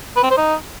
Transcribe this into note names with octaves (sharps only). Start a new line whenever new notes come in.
B4
C4
C5
D#4